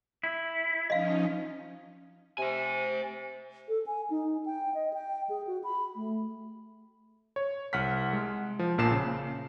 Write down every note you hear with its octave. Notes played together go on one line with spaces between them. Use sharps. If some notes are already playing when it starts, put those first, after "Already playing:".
E4
F3 C#4 D#4 D#5 F5
C3 C5 G#5
A4
G#5
D#4
G5
D#5
G5
G#4
F#4
B5
A3
C#5
C2 F#5 F6 B6
G#3
F3
A#1 A#2 A5 C7 E7
C#3